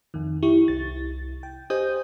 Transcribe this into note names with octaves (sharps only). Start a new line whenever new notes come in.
F2 D#3
E4 G4 C#6
C2 A6
G5
G4 C5 D#5 G#5 D#6 G6